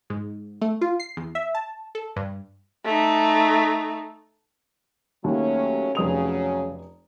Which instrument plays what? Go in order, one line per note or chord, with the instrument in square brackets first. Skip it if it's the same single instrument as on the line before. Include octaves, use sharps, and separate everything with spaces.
[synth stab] G#2
A3
F4
C7
E2
E5
A5
A4
G2
[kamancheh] A3 D#4
[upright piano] D#2 [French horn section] F#3 A3 C#4
[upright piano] F1 D#6 F7 [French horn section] C#3 F#3